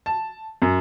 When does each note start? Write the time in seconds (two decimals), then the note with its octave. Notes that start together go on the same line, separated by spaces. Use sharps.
0.06 A5
0.62 F#2